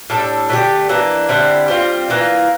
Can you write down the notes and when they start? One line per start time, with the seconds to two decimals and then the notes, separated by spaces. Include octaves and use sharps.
0.10 A2 G3 D4 A4
0.49 D3 A3 D4 G4
0.89 E3 A#3 D4
1.29 D3 G3 C4 E4
1.68 G3 C4 F4
2.08 E3 A#3 F4